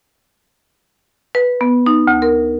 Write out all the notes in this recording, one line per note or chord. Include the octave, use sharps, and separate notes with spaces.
B4
B3
D#4
D2
A#4